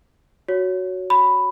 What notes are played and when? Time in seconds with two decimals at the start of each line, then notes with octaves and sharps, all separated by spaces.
0.48 F#4 C#5
1.10 B5